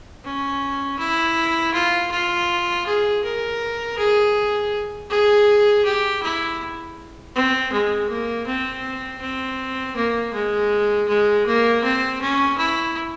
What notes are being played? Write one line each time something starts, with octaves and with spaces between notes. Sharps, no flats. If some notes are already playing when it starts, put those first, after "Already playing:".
C#4
E4
F4
F4
G#4
A#4
G#4
G#4
G4
E4
C4
G#3
A#3
C4
C4
A#3
G#3
G#3
A#3
C4
C#4
E4